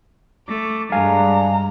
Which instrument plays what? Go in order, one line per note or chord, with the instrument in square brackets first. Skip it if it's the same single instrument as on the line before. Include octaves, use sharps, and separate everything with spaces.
[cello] A3 [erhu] D6
[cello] G2 [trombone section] G#3 D4 [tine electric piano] F5 G#5 [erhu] A#5